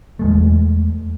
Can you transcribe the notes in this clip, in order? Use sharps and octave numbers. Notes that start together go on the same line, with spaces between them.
E2 G#3 A3